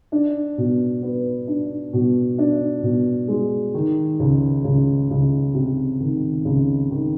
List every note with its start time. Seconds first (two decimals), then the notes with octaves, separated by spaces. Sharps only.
0.12 D4
0.58 B2
1.02 B3
1.48 D4
1.93 B2
2.38 D4
2.83 B2
3.28 G#3
3.74 D#3
4.20 C#2
4.64 C#2
5.10 C#2
5.55 C3
6.00 D#3
6.45 C#2
6.91 D#3